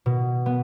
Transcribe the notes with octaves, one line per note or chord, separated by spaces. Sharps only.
B2
B3